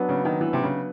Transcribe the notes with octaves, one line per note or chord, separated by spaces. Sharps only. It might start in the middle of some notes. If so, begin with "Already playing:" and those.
Already playing: F#3 B3 D4
C#3
D#3
E3
C3
C#3